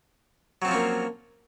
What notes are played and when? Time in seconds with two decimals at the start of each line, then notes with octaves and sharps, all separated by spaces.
0.62 F#3
0.65 C4
0.68 F3
0.71 C#4
0.74 A#3